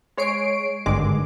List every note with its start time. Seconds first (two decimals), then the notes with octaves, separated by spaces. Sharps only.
0.17 G#3 C#5 C7 D7
0.86 G#1 G2 D3 D#3 G#3 D6